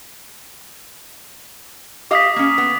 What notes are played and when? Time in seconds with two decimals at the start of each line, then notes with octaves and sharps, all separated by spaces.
2.11 G4 D#5 F5 D6 D#6 B6
2.36 A#3 C#4
2.58 B3